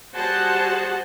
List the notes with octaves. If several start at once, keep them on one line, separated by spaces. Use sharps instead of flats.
G3 F#4 G#4 C5 F#5 A5